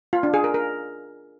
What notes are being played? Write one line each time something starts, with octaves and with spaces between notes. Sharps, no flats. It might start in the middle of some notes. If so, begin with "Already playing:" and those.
F4
D4
G#4
A#4
A#4